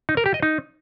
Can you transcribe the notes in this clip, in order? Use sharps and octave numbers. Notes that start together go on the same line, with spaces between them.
D#4
A#4
G4
D#5
D#4